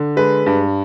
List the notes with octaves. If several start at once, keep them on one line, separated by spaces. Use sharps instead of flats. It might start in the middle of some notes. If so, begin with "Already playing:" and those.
Already playing: D3
G#3 B4
G2